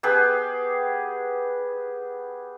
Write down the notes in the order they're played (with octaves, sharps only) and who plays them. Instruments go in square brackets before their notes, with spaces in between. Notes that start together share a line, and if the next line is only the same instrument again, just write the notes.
[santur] B3 G4 G#4 B4